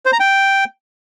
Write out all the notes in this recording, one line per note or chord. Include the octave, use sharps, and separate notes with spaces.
C5
A#5
G5